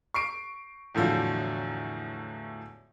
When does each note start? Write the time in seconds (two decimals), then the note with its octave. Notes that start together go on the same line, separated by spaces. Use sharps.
0.14 C#6 C7 D7
0.95 E2 A2 D3 F3 F#3